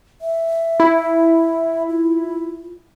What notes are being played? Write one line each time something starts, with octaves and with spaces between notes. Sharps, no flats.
E5
E4
F4